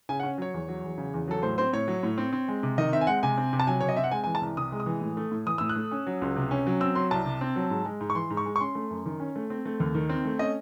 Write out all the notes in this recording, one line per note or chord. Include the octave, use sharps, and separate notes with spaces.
C#3 G#5
F#5
C#4
F#3 C#5
E2
F#3
E2
C#3
E2
F#3 A4
A2 C5
C4 C5
A2 C#5
F#3
A2
C4
C4
G#3
C3
D#3 D#5
C4 E5
G#5
G#3 F#5
C3 G#5
C4
C3
A5
F#3 G#5
C3 C#5
D#5
C4 E5
F#5
G#3 G#5
G#5
E3
A5
C2
C3 D#6
G#3
D#6
E3
A2
A3
A2
E3 D#6
A2 E6
F#6
A3
C#4
F#3
C#2
C3
C#4
F#3
C4 E6
F#3 C6
C2 A5
C3
C4
F#3
G#2
G#3
G#2
C#6
E3 C6
G#2
C#6
G#3
C#6
C#4 C6
A3
F#2
D#3
C#4
A3
C4
A3
D#2
D#3
C4
A3
C#4 D#5